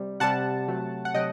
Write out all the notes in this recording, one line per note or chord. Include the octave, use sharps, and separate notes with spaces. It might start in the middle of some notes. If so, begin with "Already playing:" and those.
Already playing: C3 G3
C3 G3 F#5 A5
C3 F#3 A3
F#5
C3 F#3 D#5 G5